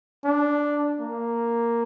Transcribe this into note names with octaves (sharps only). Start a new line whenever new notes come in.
D4
A#3